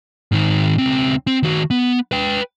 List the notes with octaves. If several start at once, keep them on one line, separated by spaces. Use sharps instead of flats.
G#2 D#3
C#2 C4
C4
D#3 F#4
B3
B4 G5